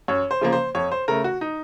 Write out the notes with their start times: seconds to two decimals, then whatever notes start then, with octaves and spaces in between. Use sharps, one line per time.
0.08 F#2 C#5
0.31 C5
0.41 C#3 F3 A#3
0.52 C5
0.75 F2 C#5
0.92 C5
1.08 C#3 A3 A#4
1.24 F#4
1.41 D#4